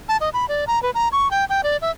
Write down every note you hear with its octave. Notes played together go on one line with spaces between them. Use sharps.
A5
D#5
B5
D5
A#5
B4
A#5
C#6
G5
G5
D5
E5